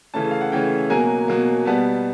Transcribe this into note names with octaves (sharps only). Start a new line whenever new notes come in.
C#3 E3 A3 C#4 A5
F5
F#5
C#3 E3 A3 C#4 G5
B2 F#3 A#3 G#5
B2 F#3 A#3
B2 G3 B3 A5